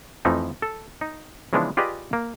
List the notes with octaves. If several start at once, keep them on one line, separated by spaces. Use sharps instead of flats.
F2 E3 F3 A3 D#4
A4
D#4
C#3 E3 F3 G#3 B3 D4
F4 G4 G#4 B4 D5 D#5
A#3